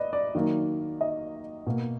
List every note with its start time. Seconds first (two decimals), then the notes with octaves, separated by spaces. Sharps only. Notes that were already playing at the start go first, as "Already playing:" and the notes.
Already playing: B4 D5 D#5
0.13 D5
0.35 D#3 F#3 A#3
1.01 D#5
1.67 B2 A#3